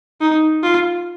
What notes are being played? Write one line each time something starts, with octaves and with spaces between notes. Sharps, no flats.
D#4
F4